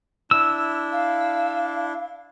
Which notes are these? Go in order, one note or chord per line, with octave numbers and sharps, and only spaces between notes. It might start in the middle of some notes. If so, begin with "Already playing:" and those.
D4 E4 E6
F5